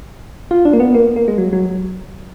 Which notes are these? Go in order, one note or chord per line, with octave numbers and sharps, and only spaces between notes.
F4
D4
A#3
B3
A#3
A#3
G#3
F#3
F#3